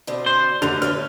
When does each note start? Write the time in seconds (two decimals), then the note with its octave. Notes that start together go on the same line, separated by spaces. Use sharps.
0.07 B2 D3 C4
0.26 C5
0.62 D#2 D3 A3 F#4 F7
0.82 B4 C#5 E5 F6